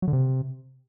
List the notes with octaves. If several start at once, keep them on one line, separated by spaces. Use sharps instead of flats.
F#3
D3
C3